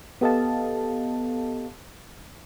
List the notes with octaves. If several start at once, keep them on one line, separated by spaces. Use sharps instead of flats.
B3 G4 A4 D#5 F5 A5